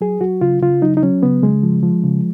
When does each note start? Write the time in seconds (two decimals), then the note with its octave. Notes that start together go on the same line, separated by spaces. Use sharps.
0.01 F#3 G#4
0.21 F#3 F#4
0.41 C#3 F4
0.62 C#3 F4
0.82 F#3 D#4
0.97 D#4
1.03 F#3 C#4
1.23 C#3 B3
1.42 C#3 G#3
1.63 F3
1.83 F3
2.03 C#3